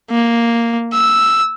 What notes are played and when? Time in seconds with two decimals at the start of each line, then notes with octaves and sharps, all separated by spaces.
0.11 A#3
0.93 E6